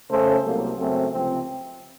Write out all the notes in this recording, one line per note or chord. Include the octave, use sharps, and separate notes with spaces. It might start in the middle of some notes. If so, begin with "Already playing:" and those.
C#3 A3 C#4 A4 C5
C2 C3 F#3 A#3
F#2 C#3 A3 C4
C#2 C3 F3 C4